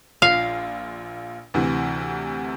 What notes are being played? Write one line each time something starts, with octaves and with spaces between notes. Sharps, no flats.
A#1 F4 F5
D2 C3 E3